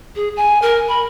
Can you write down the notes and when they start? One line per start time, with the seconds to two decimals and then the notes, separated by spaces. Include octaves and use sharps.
0.16 G#4
0.37 G#5
0.62 A#4
0.89 B5